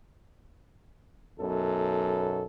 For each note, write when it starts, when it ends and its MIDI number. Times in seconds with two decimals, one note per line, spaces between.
1.39 2.44 35
1.39 2.44 42
1.39 2.44 47
1.39 2.44 69